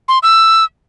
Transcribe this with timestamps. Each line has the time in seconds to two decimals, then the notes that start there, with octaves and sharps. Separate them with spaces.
0.08 C6
0.23 E6